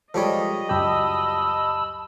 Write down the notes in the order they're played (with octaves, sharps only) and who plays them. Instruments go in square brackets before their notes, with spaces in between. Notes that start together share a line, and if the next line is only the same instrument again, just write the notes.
[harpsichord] F3 G3 C#5 [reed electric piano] G#3 A4 [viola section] D#5
[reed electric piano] C#2 F#2 G4 [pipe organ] A5 B5 E6